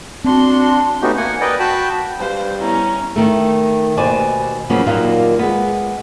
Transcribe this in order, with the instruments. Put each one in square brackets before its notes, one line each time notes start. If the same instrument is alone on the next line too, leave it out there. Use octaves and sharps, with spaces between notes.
[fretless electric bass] C4 [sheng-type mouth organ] D4 [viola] F#4 C6
[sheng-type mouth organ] A3 B3 C#4 D#4 F#4 G4
A#3 F#5 G#5
A#4 B4 D5 D#5 G5
F#4 G5 A5 B5
[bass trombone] G3 [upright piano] B4 F5 [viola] C5
[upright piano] B3 E4 [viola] C#4 [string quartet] A#5
[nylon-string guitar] D#3 A3
D#2 B2 C5 D5 G#5
C#3 F3 F#3 A#3 B3 C#4
D#2 A#2 F#3 A#3 D#4 F4
G#3 B3